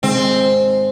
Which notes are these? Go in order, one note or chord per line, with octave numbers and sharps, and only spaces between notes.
G#2 D#3 G#3 C4